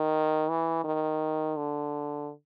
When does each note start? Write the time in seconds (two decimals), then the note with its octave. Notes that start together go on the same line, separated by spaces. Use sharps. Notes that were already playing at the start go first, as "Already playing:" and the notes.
Already playing: D#3
0.49 E3
0.84 D#3
1.57 D3